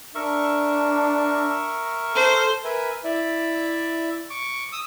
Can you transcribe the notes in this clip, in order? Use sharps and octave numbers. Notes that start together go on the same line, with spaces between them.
D4 A#4 E5 C#6
A4 C5
A#4 B4 E5 G#5
E4 D5 E5
C#6 D6
D#6 E6